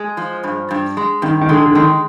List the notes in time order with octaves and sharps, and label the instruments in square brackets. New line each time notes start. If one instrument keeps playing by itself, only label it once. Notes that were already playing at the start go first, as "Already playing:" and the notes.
Already playing: [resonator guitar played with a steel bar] G#3
F3
G2
G2
G#3
[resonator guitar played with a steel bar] G2 [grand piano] D#3
[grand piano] D#3
[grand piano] D3 [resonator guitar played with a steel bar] G#3
[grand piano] D3
[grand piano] D#3 [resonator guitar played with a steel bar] G#3